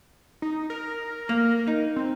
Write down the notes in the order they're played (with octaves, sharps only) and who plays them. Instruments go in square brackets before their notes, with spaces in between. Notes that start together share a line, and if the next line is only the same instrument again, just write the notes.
[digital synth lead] D#4
A#4
[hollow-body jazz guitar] A#3
D#4
[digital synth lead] C4